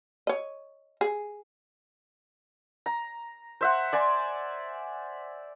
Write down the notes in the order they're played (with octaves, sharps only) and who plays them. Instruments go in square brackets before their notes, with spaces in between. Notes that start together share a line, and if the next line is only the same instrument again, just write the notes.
[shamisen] C#5 D#5
G#4
[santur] A#5
C5 E5 F#5
D5 G#5 C6